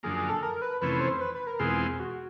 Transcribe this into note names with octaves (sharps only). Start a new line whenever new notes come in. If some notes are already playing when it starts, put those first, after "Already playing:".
F#2 D3 F3 A#3 G#4
G#4
A4
A#4
B4
F2 C3 E3 A3 C#4 B4
C5
B4
B4
A#4
E2 B2 G#3 C4 F4 G#4
F#4